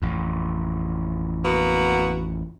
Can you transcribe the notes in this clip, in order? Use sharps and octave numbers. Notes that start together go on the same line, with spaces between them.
A1 F2
A#3 B3 F#4